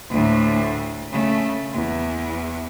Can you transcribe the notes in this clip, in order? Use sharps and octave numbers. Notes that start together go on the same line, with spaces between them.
D2 A2
C#3 A3
E2